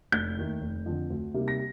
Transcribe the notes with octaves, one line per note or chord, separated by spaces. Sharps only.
F1 G6
D#2 D#3 A3
F1
F2 D3
D2
C3 G3 A#3 D#4
A#6